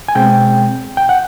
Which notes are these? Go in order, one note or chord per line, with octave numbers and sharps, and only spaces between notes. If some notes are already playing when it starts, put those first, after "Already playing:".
G#5
B2 G#3 C4 G5
G5
F#5